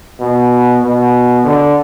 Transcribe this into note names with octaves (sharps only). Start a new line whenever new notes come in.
B2
B2
D3